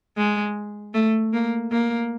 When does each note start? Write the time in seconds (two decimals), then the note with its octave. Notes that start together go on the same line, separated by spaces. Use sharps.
0.17 G#3
0.94 A3
1.34 A#3
1.72 A#3